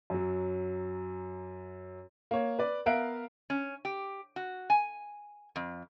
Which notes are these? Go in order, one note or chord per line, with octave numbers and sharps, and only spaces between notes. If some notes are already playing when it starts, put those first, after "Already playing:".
F#2 F#3
A#3 C#5
B4 D5
B3 A#4 E5 F5 F#6 D7
C#4
G4
F#4
G#5
F2